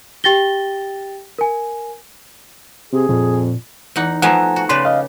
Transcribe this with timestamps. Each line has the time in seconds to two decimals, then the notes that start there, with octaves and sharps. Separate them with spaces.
0.24 G4 G5 A6 A#6 G7
1.39 A#4 G#5
2.93 C3 G#4
3.09 F2 A#2
3.96 E2 D#4 F#5
4.22 F3 A3 B3 F#5 G#5 A#5
4.56 F#4
4.69 C#3 B4 D5 C6
4.85 D#5 F5